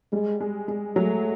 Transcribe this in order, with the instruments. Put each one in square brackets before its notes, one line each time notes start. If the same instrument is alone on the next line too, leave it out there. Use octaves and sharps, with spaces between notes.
[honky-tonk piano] G3 [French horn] G#3
[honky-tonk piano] G#3
G#3
[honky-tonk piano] F#3 [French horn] A3